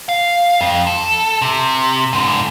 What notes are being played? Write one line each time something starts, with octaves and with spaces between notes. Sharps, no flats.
F5
F2
A4
C3
G#2 D3